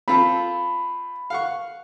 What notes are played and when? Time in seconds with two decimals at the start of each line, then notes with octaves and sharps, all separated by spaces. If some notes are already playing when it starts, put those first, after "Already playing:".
0.08 C4 F4 A4 B5
1.30 F5 F#5 C#6